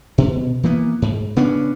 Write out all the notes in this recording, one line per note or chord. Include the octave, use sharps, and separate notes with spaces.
B2
E3 A#3 B3
G#2
C#3 B3 C#4 D4